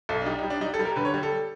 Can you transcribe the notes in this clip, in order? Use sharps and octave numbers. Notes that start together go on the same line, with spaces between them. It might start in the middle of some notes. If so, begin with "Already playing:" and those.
B1 A4
D4
G3 D#4
D#4
G3
D4
G3 D#4
A4
G3
A#4
D3 B4
C#5
G3
A4